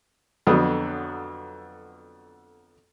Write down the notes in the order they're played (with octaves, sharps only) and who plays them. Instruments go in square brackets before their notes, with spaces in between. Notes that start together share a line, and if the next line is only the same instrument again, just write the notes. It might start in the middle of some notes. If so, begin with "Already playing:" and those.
[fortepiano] F2 D3 F#3 B3 D#6